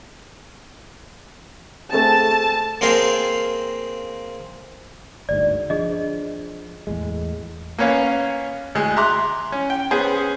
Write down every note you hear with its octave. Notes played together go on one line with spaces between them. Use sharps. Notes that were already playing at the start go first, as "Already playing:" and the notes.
A3 C4 G#4 A5
A#3 C4 G#4 A#4 F5 G5
G1 D2 G#2 D5
F3 D4 G#4 D#5
E2 A2 G#3
A#3 B3 C#4 C#5 F5
D2 G#3
E5 A#5 C6 D6 F#6
C#4
G5
B3 C#4 G#4 C5